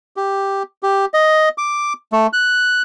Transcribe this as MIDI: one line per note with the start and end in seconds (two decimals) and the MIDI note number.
0.17 0.63 67
0.83 1.05 67
1.14 1.49 75
1.58 1.93 86
2.12 2.27 57
2.33 2.82 90